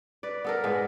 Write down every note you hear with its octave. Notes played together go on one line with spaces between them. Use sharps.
B4 D5
B3 A4 A#4
G#2 G#3 B3